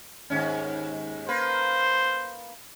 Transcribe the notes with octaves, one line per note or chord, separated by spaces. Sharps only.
D#2 G#2 C#4
A#3 B4 C5